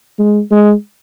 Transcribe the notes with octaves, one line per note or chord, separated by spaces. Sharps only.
G#3
G#3